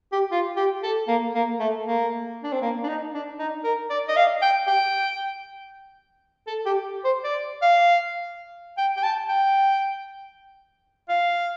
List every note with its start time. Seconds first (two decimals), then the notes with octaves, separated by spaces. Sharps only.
0.12 G4
0.32 F4
0.56 G4
0.83 A4
1.08 A#3
1.35 A#3
1.60 A3
1.85 A#3
2.43 D4
2.52 C4
2.62 A#3
2.84 D4
2.88 D#4
3.14 D4
3.39 D#4
3.64 A#4
3.90 D5
4.08 D#5
4.16 F5
4.42 G5
4.67 G5
6.47 A4
6.66 G4
7.05 C5
7.24 D5
7.62 F5
8.78 G5
8.97 G5
9.03 A5
9.29 G5
11.09 F5